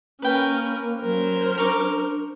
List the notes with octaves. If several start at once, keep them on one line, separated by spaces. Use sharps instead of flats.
A#3 C#4 A#4 B4 G5
F#3 C#4 A#4 C5
D4 A#5 C#6 D6